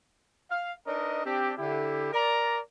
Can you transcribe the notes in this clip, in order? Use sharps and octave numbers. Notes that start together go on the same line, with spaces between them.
F5
D4 D#4 A#4 B4 D#5
C4 D4 G4
D3 E4 G4
A#4 D5 A#5